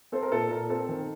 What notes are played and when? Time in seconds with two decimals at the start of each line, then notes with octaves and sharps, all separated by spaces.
0.12 C4 A4 C5
0.23 A#4
0.32 A#2 A4
0.50 A#2 A#4
0.70 C4 A4
0.89 D#3